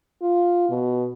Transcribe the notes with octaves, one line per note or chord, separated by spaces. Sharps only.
F4
B2